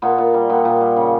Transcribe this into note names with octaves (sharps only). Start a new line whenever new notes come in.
A#2 B3
A#2
G3
A#2 B3
A#2
G3
C#3